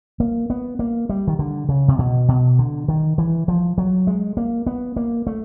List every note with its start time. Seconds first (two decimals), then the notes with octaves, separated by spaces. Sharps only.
0.20 A#3
0.50 B3
0.79 A#3
1.09 G3
1.28 D#3
1.39 D3
1.69 C#3
1.88 C3
1.99 B2
2.28 B2
2.59 D3
2.88 D#3
3.18 E3
3.48 F3
3.78 F#3
4.07 G#3
4.37 A#3
4.67 B3
4.96 A#3
5.27 A3